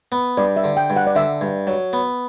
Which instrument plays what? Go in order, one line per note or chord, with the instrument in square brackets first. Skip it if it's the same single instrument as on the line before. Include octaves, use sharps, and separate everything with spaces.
[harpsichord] B3
[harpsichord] G2 [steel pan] D5
[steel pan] E5
[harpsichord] D3
[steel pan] G5
[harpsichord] G2
[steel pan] F#5
D5
[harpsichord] D3 [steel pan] E5
[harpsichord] G2
F#3
B3